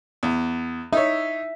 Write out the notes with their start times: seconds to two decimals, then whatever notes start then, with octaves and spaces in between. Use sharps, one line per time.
0.23 E2
0.93 D#4 C#5 E5